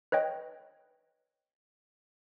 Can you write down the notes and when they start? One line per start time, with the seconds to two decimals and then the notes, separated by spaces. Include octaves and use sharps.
0.12 B4 C#5 D#5 G5